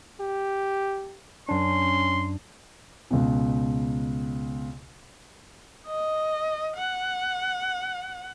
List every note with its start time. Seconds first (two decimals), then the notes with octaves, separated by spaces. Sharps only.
0.20 G4
1.49 F#2 C#4 D4 C6
3.11 C#2 B2
5.87 D#5
6.76 F#5